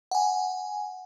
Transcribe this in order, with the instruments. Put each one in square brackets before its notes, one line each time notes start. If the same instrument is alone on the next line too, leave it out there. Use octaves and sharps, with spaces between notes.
[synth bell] F#5 G#5